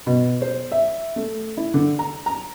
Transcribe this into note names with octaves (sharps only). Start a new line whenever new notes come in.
B2
C5
E5
A3
E4
D3
A#5
A#5